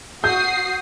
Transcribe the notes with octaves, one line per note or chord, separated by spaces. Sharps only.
F#4 D#6 G6 C7